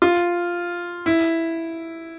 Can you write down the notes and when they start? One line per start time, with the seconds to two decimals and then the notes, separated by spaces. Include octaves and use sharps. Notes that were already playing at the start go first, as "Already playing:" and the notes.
0.02 F4
1.06 E4